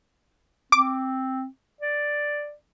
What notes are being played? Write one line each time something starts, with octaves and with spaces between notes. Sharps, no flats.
C4 D6
D5